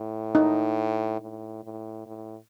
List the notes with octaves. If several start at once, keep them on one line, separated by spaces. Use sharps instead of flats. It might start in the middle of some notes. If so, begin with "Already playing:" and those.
Already playing: A2
D#4
A2
A2
A2